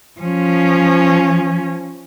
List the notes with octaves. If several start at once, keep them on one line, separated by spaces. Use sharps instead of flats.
F3 C#4